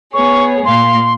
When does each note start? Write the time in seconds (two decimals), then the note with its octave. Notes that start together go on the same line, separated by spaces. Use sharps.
0.13 B3 G#4 C#5 C#6
0.65 A#2 F5 C6